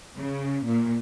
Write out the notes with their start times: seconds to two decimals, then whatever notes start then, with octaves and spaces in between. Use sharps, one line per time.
0.16 C#3
0.65 A#2